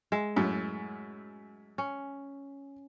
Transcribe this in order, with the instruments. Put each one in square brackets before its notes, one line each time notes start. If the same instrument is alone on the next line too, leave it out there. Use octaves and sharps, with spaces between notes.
[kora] G#3 E5
[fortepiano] F#2 A2
[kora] C#4